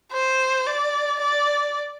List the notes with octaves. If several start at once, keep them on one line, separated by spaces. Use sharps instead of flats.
C5
D5
D5